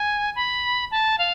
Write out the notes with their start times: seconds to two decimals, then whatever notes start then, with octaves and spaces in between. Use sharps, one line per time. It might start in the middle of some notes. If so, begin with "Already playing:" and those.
Already playing: G#5
0.36 B5
0.91 A5
1.18 F5